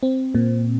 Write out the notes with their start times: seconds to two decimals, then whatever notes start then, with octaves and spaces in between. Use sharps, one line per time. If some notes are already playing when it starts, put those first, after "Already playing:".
0.03 C4
0.35 A#2